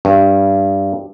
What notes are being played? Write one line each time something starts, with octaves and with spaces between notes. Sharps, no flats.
G2